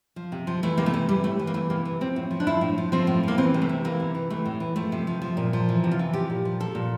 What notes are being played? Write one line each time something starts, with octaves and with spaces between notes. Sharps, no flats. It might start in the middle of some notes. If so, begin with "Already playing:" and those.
F3
C3
F3
E3 A3
C3 A#3
A3
E3
E3 G3
A2 A3
E3
A#3
E3 A3
C3 A#3
E3
F3 C4
A2
F3
D4
F3 E4
A2
F3
F3 C4
A2
F3 A#3
E3 C4
C3
A3
E3
E3 A#3
C3
E3
E3 A3
A2
E3
F3 A3
C3
F3
F3
A#2
F3
E3
C3
F4
E3
F3 G4
A#2
F3
F3 A4
A#2